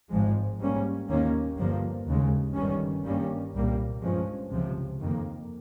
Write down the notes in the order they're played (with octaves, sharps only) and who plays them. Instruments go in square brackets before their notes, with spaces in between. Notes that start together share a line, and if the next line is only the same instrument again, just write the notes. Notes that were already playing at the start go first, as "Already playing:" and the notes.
[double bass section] G#1 G#2 F3 G#3
G#2 G3 A#3 C#4
D#2 D#3 A#3 C#4
G1 G2 F3 A#3
D#2 C#3 G#3
G1 G2 D#3 G3 C#4
G2 D#3 G3 A#3 C#4
C2 A#2 G3 A#3
G2 F3 G#3 C#4
C#2 C3 F3
F2 D#3 A#3